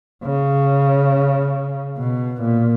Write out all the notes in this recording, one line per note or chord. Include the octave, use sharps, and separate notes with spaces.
C#3
B2
A#2